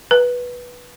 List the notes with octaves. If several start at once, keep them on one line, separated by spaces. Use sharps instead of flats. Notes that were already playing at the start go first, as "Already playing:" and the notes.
B4